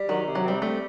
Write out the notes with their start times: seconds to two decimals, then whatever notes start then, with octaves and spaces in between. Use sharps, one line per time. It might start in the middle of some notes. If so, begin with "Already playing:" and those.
Already playing: G3
0.09 D#3 F#3
0.26 C3
0.35 F#3
0.44 G3 C4
0.61 G3 A3